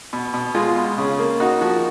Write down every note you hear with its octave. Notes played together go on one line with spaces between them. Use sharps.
B2
B2
G#3 F4
B2
C#3
A#3
D#4 F#4
F3 F#4